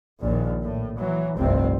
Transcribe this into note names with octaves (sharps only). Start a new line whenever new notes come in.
A#1 D#2 A#2
A2
E3 F#3
F1 C2 G2 C3 C4